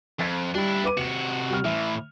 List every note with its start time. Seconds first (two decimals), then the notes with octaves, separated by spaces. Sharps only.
0.20 F2 G#6 A6 B6
0.55 G3 D4 E4
0.84 B4 D6 D#7
0.97 C3 F#4 C#7 E7
1.50 G3 F6
1.65 A2 E3 E5